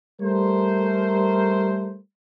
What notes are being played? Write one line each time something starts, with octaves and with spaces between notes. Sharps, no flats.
G3 A3 A#4 C5